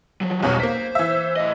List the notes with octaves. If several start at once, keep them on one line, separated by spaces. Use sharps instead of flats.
F3 F#3
B1 E2 B2 G3 C#5
A#3 C5 B6
E3 E5
A2 D#5